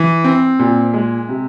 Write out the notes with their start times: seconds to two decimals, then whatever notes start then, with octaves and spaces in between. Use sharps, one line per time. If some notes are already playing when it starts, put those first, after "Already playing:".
Already playing: E3
0.24 C4
0.59 A#2
0.94 G#3
1.29 C3